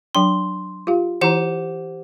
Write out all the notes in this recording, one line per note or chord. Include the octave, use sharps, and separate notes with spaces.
F#3 D4 G5 C6
F4 G4 F5
E3 E4 G4 C5 F#5 A#5